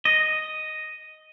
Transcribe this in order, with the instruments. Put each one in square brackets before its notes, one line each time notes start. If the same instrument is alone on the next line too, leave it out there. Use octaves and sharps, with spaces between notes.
[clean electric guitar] D#5